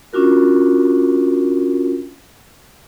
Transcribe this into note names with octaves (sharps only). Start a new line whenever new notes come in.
C#4 D4 F4 F#4 A#4